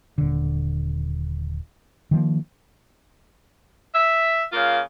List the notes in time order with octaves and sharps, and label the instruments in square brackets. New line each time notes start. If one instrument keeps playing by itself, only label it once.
[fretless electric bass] D#1 D3
D#3 F3 A#3
[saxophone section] E5
C#3 A#3 F4